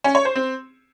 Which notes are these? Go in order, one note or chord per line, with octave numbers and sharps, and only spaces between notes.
C#4
C#5
C5
C4